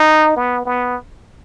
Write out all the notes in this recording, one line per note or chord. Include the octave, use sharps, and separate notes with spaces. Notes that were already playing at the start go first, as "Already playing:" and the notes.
Already playing: D#4
B3
B3